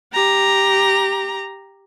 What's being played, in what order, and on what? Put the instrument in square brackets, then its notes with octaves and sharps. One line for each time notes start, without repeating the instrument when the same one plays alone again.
[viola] G4 A#5